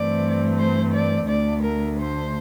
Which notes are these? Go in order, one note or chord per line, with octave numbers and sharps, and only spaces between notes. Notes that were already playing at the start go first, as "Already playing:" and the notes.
Already playing: G2 E3 A3 C4 D5
C5
D5
D2 D3 A3 D5
A#4
C5